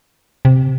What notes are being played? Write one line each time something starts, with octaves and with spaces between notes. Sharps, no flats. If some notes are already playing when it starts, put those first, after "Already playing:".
C3